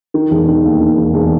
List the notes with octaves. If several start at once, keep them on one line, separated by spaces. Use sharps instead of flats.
D#3
E1
D#3
D#2
D#3
E1
E1